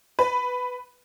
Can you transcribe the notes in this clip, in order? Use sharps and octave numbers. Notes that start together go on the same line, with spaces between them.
B4